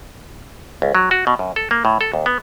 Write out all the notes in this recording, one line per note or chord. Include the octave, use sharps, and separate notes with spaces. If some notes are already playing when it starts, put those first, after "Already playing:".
C#2
F#3
F#4
B2
F#2
A4
A#3
A2
A4
D#2
B3